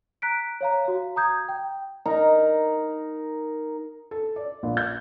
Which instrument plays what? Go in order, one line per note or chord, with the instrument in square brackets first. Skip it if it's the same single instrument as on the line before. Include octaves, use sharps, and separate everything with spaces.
[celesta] A#5 F#6 B6 D7
C#5 F5 A#5
F#4 F5
A#5 D#6 G6 G#6
G5
[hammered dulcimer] D#4 A#4
[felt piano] A4
D5
A#1
G6